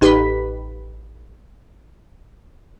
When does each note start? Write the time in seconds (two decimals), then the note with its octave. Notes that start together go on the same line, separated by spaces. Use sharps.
0.01 A1 D#4 G4 B4 B5 B6